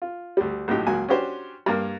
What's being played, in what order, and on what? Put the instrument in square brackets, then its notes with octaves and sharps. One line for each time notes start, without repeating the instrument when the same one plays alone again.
[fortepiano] F4
D2 G3
A#1 A2 F#3 D#4 G4
C#2 F#3 A#3 G#5
C#4 D4 F#4 G4 C5
G2 A#3 A#4